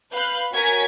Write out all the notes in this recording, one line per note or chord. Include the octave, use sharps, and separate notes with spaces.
B4 F5 B5 F#6 G6
F#4 A#4 C#5 G#5 G#6 B6